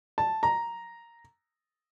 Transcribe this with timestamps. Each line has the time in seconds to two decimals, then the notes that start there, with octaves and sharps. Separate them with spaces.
0.18 A5
0.43 A#5